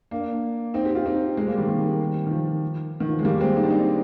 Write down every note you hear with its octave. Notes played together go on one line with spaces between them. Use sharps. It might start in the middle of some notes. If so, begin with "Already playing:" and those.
A#3 D4
C4 D#4
G4
F4
C4 D#4
G#3 C4
G3 A#3
D#3 G3
D#3 G3
D#3
F3
D#3
F3
G#3
G3 A#3
G#3 C4
D#4
D4
C4 D#4